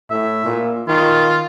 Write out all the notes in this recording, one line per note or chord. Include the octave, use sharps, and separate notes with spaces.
A2 E5
A#2
D#3 F4